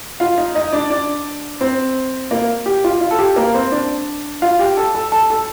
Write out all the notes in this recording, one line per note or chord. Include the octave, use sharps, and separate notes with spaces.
F4 F5
D#4 D#5
D#4 D#5
D4 D5
D4 D5
C4 C5
A#3 A#4
G4
F4
F4
A4
G4
A#3 A#4
C4 C5
D4 D5
F4 F5
G4 G5
A4 A5
A4 A5
A4 A5
A4 A5